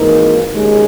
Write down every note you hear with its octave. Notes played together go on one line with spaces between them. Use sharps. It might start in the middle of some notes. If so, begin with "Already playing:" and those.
Already playing: G#1 G#2 E3 A#3 D#4
D#2 C#3 G#3